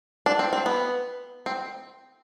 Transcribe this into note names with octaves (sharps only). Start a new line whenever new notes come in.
D4
C4
C4
B3
C4